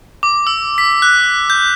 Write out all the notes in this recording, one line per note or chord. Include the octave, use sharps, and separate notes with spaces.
D6
E6
B6
F#6
G6